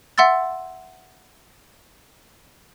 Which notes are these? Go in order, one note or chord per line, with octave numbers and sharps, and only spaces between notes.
E5 F#5 C6 E6 A6